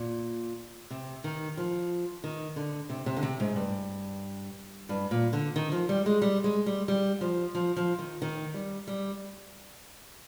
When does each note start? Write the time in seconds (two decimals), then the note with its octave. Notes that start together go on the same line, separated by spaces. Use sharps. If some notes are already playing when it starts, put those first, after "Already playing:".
Already playing: A#2
0.90 C3
1.24 D#3
1.57 F3
2.24 D#3
2.56 D3
2.90 C3
3.06 C3
3.17 D3
3.23 C3
3.40 G#2
3.56 G2
4.89 G2
5.11 A#2
5.33 D3
5.56 D#3
5.72 F3
5.89 G3
6.06 G#3
6.22 G3
6.44 G#3
6.66 G3
6.88 G3
7.21 F3
7.55 F3
7.76 F3
7.98 D#3
8.22 D#3
8.54 G3
8.87 G3